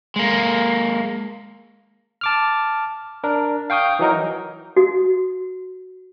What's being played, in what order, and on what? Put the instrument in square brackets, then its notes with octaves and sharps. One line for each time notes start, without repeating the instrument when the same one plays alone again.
[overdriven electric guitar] G#3 A#3
[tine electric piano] A5 D6 F6
D4 A#4
F5 G5 C#6 D#6 G6
E3 F#3 D#4 A#4
[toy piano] F#4